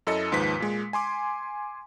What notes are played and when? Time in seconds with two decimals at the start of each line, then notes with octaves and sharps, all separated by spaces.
0.07 F#2 E4 A4 D#5 C#7
0.32 D#2 G#2 F3 B4 B6
0.60 A#2 G#3
0.93 G#5 C6 D6